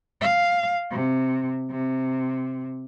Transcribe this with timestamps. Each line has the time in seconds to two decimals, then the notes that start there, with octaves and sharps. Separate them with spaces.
0.21 F5
0.91 C3
1.71 C3